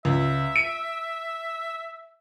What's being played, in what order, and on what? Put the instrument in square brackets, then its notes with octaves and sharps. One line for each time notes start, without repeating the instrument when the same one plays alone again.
[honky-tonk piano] C#2 [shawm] E5
[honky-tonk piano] D7